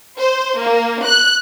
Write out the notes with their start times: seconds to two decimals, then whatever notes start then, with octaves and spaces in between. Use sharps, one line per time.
0.17 C5
0.58 A#3
1.04 F#6